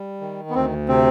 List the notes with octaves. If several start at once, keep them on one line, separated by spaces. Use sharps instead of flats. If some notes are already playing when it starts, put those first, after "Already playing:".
Already playing: G3
D#3
B3
D2 C4
C3 C4